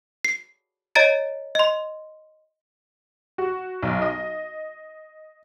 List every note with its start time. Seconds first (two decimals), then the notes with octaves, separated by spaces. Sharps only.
0.25 C7
0.95 C#5 D#5 A#5 A6 D7
1.55 D#5 C6
3.38 F#4
3.82 B1
4.02 D#5